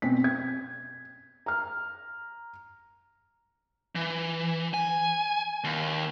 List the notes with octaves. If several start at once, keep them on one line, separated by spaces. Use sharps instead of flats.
B2 C4 C#4 B6
G#6
A#5 F6
E3
G#5
D#2